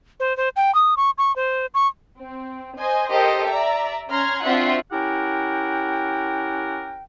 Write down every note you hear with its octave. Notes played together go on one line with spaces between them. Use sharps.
C5
C5
G5
D#6
C#6
C#6
C5
C#6
C4
C5 D#5 G#5
G4 A4 A#4 C5 D#5
D5 E5 A#5
C#4 A#5 C6 F6 G#6
C4 D4 F4 F#4 E5 F#5
C#4 E4 G4 A#4 F#5 G5